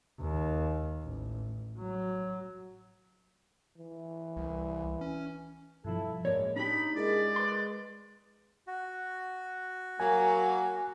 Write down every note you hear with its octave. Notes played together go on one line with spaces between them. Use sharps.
D#2
A1
F#3
E3
C2
C#4
G2 B2 F3 E4 A4
F#2 A2 G#3 A#3 C#5 D5
D4 D#4 G4 B5
G#3 E4 G#4 A#4 D5
B4 C6
F#4
F#3 A#3 G#5